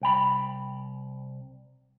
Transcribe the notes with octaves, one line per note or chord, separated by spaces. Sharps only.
C2 G5 B5